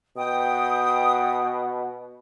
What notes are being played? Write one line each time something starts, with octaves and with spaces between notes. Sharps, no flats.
B2 G5 D#6